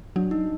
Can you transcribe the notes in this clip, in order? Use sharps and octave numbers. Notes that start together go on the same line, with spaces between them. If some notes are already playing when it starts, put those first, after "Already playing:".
F#3 D4
D#4